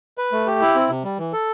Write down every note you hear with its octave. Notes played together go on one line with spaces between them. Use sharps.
B4
A3
G4
E4
C4
C3
G3
E3
A4